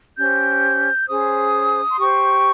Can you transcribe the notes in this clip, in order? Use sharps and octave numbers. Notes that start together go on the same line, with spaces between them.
C#4 G4 C5 G6
C#4 G#4 C5 D#6
C6
G4 C5 C#6